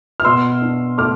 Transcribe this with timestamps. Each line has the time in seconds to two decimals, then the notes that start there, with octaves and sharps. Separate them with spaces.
0.20 F6
0.25 B2 C6 E6
0.62 D4
0.98 A3 D6 F6